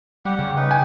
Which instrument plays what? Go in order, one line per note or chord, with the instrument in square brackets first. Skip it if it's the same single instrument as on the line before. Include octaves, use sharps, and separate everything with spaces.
[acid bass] G3 [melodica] G4 F#5
[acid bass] C#3
[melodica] D#4 B4
[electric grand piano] G5 G#5